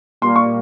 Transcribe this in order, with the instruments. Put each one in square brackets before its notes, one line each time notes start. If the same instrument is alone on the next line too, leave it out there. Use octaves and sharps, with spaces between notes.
[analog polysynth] A#2 G3 A#3 [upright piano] C6
[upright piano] C#6